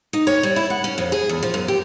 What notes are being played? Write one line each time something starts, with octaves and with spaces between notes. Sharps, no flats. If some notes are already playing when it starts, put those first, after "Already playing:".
D#4
C#5
G3
E4
F#5
C#4
F2
G#4
E2
F3
F#2
G4